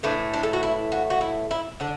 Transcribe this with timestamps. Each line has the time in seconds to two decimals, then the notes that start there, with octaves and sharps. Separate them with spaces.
0.03 A2 E3 A3 D4
0.34 D4
0.43 A4
0.53 F#4
0.63 E4
0.92 F#4
1.10 F#4
1.21 E4
1.51 E4
1.80 D3 D4